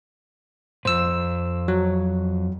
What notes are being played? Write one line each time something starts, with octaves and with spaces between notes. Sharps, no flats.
F2 G#2 C5 E6
F#3